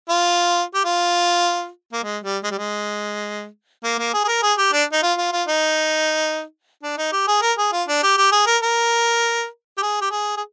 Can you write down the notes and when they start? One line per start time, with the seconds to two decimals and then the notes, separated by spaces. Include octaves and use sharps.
0.09 F4
0.74 G4
0.85 F4
1.93 A#3
2.03 G#3
2.24 G3
2.44 G#3
2.51 G3
2.58 G#3
3.84 A#3
3.98 A#3
4.14 G#4
4.24 G#4
4.28 A#4
4.43 G#4
4.58 G4
4.73 D4
4.92 D#4
5.03 F4
5.18 F4
5.32 F4
5.48 D#4
6.83 D4
6.98 D#4
7.12 G4
7.28 G#4
7.42 A#4
7.58 G#4
7.72 F4
7.88 D4
8.03 G4
8.18 G4
8.32 G#4
8.47 A#4
8.62 A#4
9.77 G4
9.82 G#4
10.01 G4
10.11 G#4
10.37 G#4